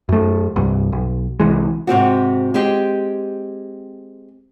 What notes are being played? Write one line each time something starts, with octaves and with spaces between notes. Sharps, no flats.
F#2 A3
C2 G2
B1
C2 E3 G#3
G#2 C3 C4 F#4
G#3 C4 G4